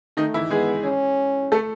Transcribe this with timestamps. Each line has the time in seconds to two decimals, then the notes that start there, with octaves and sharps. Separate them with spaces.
0.17 D#3 A3 D#4
0.34 E3 E4
0.50 G#3 B3 G#4
0.84 C#4
1.52 A3 A4